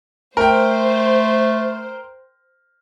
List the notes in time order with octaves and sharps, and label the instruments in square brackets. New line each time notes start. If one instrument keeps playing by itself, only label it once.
[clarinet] A3 [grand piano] A#4 G5 [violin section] C5